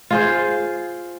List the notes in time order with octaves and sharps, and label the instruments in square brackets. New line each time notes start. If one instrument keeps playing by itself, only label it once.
[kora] F4 G#4 C5